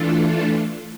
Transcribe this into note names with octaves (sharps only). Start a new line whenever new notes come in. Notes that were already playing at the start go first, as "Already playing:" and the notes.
Already playing: E3 A3 D4 F4 A4